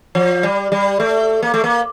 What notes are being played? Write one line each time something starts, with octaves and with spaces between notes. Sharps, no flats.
F3
G3
G3
A3
A#3
A3
A#3